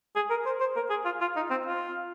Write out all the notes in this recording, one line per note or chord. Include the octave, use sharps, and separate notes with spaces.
G#4
A#4
C5
C5
A#4
G#4
F4
F4
D#4
C4
F4